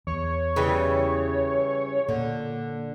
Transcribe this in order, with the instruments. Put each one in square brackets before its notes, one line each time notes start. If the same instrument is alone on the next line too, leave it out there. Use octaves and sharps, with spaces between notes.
[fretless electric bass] E2 [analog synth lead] C#5
[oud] C#3 E3 G3
[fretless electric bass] A#2 [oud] D3